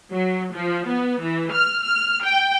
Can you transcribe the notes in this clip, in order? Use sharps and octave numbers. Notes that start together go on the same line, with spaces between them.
F#3
F3
B3
E3
F6
F6
G5